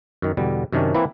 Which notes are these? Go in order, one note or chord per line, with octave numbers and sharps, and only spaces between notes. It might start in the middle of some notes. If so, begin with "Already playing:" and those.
F#2 D#3
E2 B2 D3 G3
F#2 C3 D#3 C#4 D4
E3 A#3 C4 E4 B4